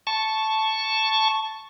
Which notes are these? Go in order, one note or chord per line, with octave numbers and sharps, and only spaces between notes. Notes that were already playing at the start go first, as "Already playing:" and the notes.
A5 C#6